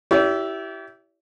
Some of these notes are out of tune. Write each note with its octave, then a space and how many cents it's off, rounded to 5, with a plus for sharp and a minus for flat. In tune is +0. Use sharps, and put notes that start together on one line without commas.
E4 +0 G4 -20 D5 -45